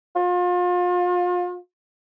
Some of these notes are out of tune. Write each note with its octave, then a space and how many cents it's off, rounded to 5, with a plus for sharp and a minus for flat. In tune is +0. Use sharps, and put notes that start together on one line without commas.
F4 +35